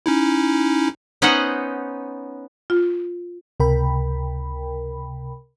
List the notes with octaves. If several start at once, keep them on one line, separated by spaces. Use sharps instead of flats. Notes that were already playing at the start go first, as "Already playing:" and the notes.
C#4 D#4 E4
B3 C#4 D#4 C5 D#5 F#5
F4
C#2 C3 A#4 G5 B5